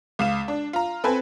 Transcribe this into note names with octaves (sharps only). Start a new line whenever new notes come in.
C#2 F5 E7
D4
F4 A#5
C4 A4 B4 C5 G#5